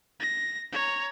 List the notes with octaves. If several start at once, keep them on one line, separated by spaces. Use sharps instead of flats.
A#6
C#5 A#5